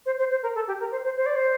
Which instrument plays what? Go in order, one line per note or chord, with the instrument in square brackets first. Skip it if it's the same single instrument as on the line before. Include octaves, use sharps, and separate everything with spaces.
[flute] C5
C5
C5
A#4
A4
G4
A#4
C5
C5
C5
D5
C5